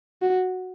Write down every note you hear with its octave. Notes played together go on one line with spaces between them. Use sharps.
F#4